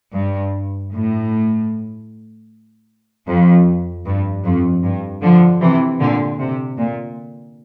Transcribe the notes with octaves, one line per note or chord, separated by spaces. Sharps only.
G2
A2
F2
G2
F2
G2
D3 F3
C3 E3
A#2 D3
C3
A#2